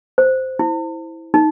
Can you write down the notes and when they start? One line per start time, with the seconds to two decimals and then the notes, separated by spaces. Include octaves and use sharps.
0.18 C5
0.59 E4
1.34 D#4